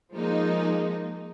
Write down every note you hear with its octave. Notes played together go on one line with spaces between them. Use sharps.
F3 G#3 A#3 D#4